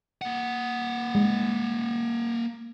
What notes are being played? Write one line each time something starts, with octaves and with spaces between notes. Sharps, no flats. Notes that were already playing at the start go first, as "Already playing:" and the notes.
A#3 F#5
G#3